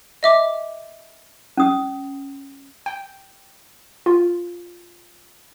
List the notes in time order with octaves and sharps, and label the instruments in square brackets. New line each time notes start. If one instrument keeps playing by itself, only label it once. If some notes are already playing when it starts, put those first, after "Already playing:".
[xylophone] D#5 E5 D6
[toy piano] C#4 D#6
[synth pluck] G5
F4